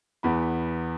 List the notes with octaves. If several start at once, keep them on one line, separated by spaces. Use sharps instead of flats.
E2 E3 B3 B5